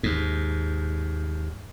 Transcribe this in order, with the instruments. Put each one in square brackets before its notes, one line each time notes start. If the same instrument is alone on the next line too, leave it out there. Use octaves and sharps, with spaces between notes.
[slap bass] D#2 G#2